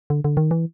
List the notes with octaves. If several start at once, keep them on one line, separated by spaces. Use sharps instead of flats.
D3
D3
D#3
E3